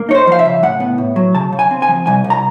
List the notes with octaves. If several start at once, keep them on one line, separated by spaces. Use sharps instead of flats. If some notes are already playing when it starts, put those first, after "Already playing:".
Already playing: A#3
D#4 C#5
C5
F3 F5
E5
C#3
A2 F#5
B3
A2
F#3
C#3 A5
C#3
G#5
C4
G#5
F3
C2 G#5
C2
A#5